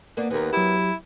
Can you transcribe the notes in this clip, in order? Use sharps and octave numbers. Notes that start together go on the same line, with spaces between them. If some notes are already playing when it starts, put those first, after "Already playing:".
A#3 B3 D4
D#2 B3 A#4
F#3 E4 G4